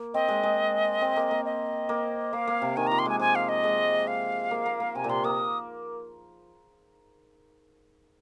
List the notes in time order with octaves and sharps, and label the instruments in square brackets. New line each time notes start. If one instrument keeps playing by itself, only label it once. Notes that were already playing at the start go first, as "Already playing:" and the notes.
Already playing: [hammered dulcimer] A#3
[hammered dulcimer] C4 [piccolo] D#5
[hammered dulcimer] G#3
G#3
C4
A#3
A#3
[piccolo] D#5
[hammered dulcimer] A#3
[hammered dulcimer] A#3 [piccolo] F5
[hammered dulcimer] A#3
C3
[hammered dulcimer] D#3 [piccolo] G#5
[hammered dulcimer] F3 [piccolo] A#5
[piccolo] C6
[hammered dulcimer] G#3 [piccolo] G#5
[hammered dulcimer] F3 [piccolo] G#5
[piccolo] F5
D#5
[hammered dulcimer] G#3
[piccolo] F5
[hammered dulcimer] A#3
A#3
A#3
[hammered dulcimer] C3 [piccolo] G#5
[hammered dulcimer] A#2
[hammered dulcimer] C3 [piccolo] C6
[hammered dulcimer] A#3 [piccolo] D#6